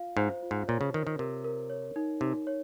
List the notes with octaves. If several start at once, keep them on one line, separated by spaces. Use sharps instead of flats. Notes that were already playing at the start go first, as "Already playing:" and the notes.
Already playing: F4 F5
G#2 C5
F4
G#2
A#2 C#5
C#3
D#3 A#4
D#3
C3 A#4
A#4
C#5
D#4
C3 D#4
C#5